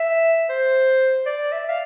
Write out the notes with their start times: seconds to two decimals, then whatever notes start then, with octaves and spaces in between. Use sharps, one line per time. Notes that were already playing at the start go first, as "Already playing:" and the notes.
Already playing: E5
0.49 C5
1.26 D5
1.52 E5
1.69 F5